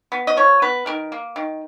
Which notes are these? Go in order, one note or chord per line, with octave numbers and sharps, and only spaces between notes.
B3
D#5
F3 C#5
B3 B4
D#3 A#4
A#3
D#3